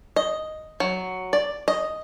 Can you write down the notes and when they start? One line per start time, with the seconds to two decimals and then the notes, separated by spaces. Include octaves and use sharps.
0.16 D#5
0.80 F#3
1.33 D5
1.68 D#5